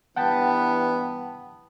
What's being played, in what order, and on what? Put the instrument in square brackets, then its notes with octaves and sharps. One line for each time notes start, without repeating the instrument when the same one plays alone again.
[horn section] G2 E3 B3 [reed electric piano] F#5 G5 A5